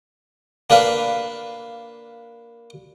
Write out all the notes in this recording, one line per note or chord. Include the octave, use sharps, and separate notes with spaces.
A#3 D4 B4 F5